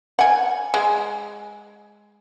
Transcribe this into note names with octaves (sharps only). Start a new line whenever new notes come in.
F#5 G#5
G#3